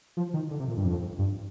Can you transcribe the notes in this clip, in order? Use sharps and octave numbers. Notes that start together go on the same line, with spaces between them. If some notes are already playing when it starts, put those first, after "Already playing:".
F3
D#3
D3
C3
A#2
G2
F2
G2